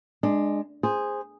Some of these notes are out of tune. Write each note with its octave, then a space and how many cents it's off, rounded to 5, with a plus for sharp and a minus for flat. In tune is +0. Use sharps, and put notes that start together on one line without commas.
G#3 +0 D4 +20
G#4 -10 C5 +0